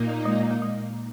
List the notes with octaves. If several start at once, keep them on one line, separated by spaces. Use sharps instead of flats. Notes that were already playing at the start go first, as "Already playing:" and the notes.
Already playing: A#2 A#3 D#4
G#3
A#3
G#3